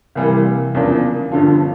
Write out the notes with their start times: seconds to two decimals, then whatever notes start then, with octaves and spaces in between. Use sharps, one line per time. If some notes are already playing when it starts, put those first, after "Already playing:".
0.15 C2 C3 E3 G3 A#3
0.75 E2 C#3 F3 A#3 D4
1.32 G1 G2 D3 F3